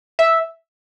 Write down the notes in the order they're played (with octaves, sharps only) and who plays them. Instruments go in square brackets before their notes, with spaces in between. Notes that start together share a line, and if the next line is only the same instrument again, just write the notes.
[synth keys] E5